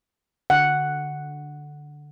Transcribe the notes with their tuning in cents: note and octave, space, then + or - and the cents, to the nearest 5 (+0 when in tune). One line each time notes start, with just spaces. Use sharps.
D3 +0 F#5 +0